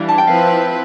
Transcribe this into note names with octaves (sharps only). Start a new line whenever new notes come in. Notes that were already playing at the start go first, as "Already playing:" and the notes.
Already playing: E3 G3 D4 F5
A5
G5
F3 C4 E4 B4 F5